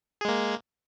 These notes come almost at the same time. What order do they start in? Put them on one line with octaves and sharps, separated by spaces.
G#4 G#3 A#3